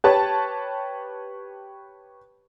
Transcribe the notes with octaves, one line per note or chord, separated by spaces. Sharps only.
G4 B4 C#5 A5